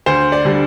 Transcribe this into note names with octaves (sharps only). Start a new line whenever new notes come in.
D2 C5
D5
D3 G3